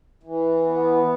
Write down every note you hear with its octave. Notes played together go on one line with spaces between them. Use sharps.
E3
B3